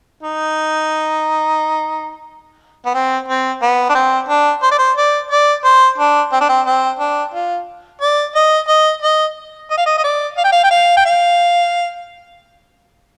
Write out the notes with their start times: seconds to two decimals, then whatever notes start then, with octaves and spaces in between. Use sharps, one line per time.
0.23 D#4
2.86 B3
2.94 C4
3.28 C4
3.62 B3
3.89 D4
3.95 C4
4.28 D4
4.63 C5
4.71 D5
4.79 C5
4.97 D5
5.31 D5
5.64 C5
5.98 D4
6.32 C4
6.41 D4
6.49 C4
6.66 C4
6.99 D4
7.34 F4
8.01 D5
8.35 D#5
8.68 D#5
9.02 D#5
9.70 D#5
9.77 F5
9.86 D#5
9.97 D#5
10.04 D5
10.37 F5
10.44 G5
10.52 F5
10.64 G5
10.71 F5
10.97 G5
11.06 F5